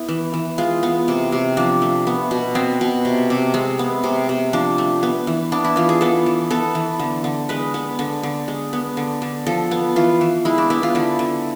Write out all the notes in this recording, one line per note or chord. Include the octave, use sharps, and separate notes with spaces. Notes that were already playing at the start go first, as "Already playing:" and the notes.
Already playing: B3 E4
E3
E3
G#3 F4
B3
C3
C3
F3 D4
A3
B3
B2
B3 C4
B2
C3
C3
G#3 C4
B3
C3
C3
F3 D4
A3
B3
E3
B3 D4
E4
E3 F4
G#4
B3 A4
E3
B3 A4
E3
D3
D3
G#3 B4
B3
D3
D3
G#3
B3
D3
D3
F3 A4
B3
E3 F4
E3
G#3 E4
D4
B3 E4
F4
D3 E4
D3